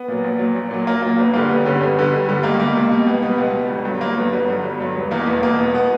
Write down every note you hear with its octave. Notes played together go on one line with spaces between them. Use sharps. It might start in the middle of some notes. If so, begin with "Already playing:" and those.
Already playing: B3
A#2 F#3
A#1
A#2 F#3
A#1
A#2 F#3
A#1 A#3
A#2 F#3 A#3
G1 B3
G2 D3 G3 A#3
G1 B3
G2 D3 G3 C#4
G1 B3
G2 D3 G3
G1
G2 D3 G3
C#2 A#3
B2 G3 A#3
C#2
B2 G3
C#2 B3
B2 G3 B3
C#2
B2 G3
G1
G2 F#3
G1 A#3
G2 F#3 B3
G1 B3
G2 F#3
G1
G2 F#3
E1 B3
E2 B2 A#3
E1 B3
E2 B2 A#3
E1 B3
B2 B3